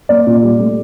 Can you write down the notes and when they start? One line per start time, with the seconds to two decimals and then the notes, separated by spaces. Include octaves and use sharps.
0.09 A#3 D5
0.27 A#2
0.43 G3
0.60 A3